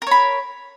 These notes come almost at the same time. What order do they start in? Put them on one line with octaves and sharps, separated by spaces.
A#4 C#5 B5